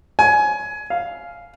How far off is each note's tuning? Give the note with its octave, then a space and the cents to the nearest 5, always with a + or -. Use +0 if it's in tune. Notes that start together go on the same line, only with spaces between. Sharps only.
G#5 +20
F5 -5